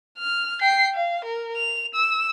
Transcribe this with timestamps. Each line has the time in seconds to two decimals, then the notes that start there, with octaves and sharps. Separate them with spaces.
0.19 F6
0.62 G5 C7
0.94 F5
1.25 A#4
1.56 F7
1.94 E6